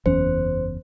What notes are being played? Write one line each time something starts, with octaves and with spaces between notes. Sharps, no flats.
F#1 E2 C#4 C5